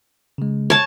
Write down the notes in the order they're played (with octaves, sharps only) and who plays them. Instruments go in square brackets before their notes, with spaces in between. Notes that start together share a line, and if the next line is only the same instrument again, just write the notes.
[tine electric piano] C#3 G#3
[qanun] C#5 A5